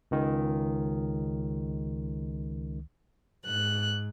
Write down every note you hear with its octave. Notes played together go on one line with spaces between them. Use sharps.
C#2 D#3
G#2 F#6